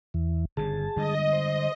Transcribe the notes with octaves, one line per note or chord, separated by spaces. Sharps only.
E2 E3
G1 G2 C#3 G#4 A5
D3 G3 G#3 D#5
C5